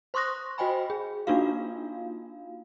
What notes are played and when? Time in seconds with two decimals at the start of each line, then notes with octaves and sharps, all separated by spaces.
0.14 C5 C6 C#6 D#6 F#6 A#6
0.58 F#4 C5 D#5 G5 G#5 B5
0.90 G#4
1.27 A#3 D4 D#4 F4 F#4 F5